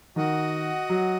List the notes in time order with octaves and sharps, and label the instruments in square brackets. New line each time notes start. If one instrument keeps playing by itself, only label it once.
[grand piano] D#3 [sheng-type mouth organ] F#4 D#5 F#5
[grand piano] F#3